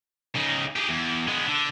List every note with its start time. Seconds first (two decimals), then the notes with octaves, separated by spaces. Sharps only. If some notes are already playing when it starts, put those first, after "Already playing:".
0.35 C#3 D#4
0.76 G4 G#4
0.89 E2
1.27 G#3 B3
1.47 D3